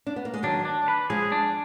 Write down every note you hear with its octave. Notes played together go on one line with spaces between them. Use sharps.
D4
B3
A#3
G#3
D#3 F#3 D4
D4
B4
F3 G#3 G#4
D4